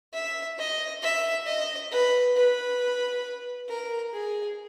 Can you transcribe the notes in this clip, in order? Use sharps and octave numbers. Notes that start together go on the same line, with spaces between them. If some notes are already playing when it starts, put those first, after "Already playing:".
E5
D#5
E5
D#5
B4
B4
A#4
G#4